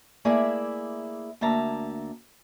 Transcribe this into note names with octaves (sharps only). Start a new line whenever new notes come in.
A3 A#3 E4 G#4 D5 E5
D2 A#3 E5 A5 A#5